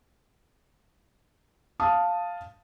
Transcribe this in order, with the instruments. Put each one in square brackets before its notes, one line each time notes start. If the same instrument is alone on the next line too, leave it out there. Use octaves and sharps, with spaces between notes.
[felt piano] F5 A5 D#6